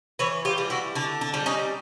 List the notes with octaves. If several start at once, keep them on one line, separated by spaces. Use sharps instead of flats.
E3 B4 C#5
F4 G4
G3
E4 F#4
D3 D4
D4
G3
C#4 D#4